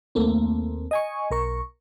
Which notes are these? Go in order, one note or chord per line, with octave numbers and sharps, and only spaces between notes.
D#2 A3 A#3 C4
D#5 G#5 C#6
B1 A#4 C#6